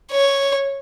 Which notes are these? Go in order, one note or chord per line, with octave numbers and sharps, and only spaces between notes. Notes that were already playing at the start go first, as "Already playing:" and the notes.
C#5